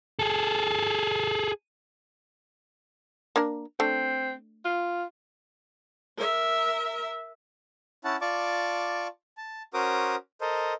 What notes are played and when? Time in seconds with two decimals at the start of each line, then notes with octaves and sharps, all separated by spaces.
0.19 G#4 A4
3.36 A#3 D4 A#4
3.80 A3 C4 D4
4.65 F4
6.17 A#4 E5
8.04 C#4 E4 F#5 A5
8.21 F4 D5 A5 C#6 D6
9.37 A5
9.74 C#4 F#4 A#4 C5 D6 D#6
10.41 A4 A#4 C5 D#5